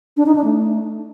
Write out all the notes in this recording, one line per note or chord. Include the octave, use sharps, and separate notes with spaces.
D4
D#4
D4
A3